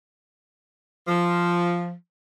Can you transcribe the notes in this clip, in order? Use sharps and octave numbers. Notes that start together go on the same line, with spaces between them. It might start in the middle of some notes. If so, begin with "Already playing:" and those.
F3